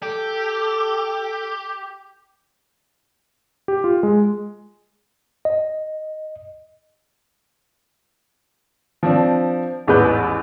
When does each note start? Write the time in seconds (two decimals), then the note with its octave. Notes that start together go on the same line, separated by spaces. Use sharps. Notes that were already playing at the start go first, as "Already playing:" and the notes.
0.03 G4 A4
3.68 G4
3.84 F4
4.03 G#3
5.45 D#5
9.03 F3 C4 D4
9.87 A1 E2 G#2 G#4 B4 G6